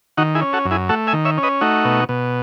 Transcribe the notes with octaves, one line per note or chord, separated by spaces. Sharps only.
D#3 D#4 F#4
E4 G#4
C#4
F#4 A4
F#2
E4 G#4
A3 F#4 A4
E5 G#5
D#3
C#5 E5
C#4
B4 D#5
A3 D#4 F#4
B2
B2